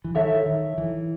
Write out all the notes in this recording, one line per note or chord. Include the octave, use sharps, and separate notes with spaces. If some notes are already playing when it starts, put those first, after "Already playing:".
E3
D#3 A4 C#5 E5
D#3
E3